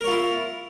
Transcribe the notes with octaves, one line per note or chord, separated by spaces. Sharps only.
E4 F4 A#4 C#5